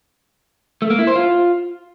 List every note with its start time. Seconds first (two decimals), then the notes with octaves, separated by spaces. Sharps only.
0.82 A3
0.90 A#3
0.99 E4
1.07 C5
1.16 F4